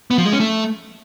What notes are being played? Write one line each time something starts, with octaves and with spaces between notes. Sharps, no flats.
B3
F3
G#3
C#4
A3